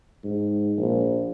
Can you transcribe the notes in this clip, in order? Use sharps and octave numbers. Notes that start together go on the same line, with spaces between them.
G#2
A#1